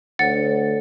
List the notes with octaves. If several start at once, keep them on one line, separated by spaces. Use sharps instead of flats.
D2 A4 C#5 F#5 A6 C#7